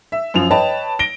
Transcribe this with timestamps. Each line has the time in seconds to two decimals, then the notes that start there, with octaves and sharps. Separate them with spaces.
0.12 E5
0.34 F#2 F3 F7
0.51 B4 C#5 D#5 G5 A5
0.99 A#6 D7 G7